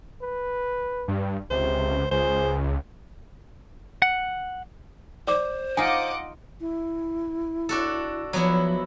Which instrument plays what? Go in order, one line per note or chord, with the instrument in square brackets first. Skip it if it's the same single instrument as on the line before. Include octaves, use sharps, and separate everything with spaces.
[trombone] B4
[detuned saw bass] G2
[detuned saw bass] C#2 [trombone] C3 [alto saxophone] C5
[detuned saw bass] C#2 [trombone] G#4 [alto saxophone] C5
[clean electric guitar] F#5
[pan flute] C5 [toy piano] D5 D6
[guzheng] D#4 F4 [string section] D#5 F#5 D6 [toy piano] G#5
[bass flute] E4
[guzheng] D4 F#4 A4
[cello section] F3 [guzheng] F#3 B3 E4